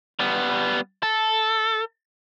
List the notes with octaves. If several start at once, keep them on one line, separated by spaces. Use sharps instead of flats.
G3 B3
A4